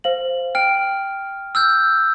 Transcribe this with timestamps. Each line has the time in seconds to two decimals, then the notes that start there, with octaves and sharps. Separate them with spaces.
0.04 C5 F5 F#7
0.55 G5 F6 D7
1.55 E6 F6 G6